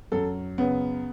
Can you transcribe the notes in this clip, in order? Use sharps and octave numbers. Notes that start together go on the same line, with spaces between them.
F#2 A4
C#3 B3